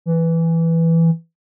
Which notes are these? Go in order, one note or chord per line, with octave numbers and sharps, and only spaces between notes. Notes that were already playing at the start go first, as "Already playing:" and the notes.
E3